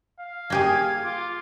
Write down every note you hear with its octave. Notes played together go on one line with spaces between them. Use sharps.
F5
A#3 G4 G#4 G#6
F4 D6